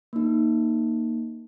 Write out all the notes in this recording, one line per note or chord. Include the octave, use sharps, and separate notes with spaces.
A#3 D#4